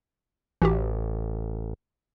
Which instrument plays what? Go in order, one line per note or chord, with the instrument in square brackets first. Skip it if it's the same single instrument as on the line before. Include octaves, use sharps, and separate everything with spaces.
[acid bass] A1 [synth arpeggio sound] E3 F#4 G4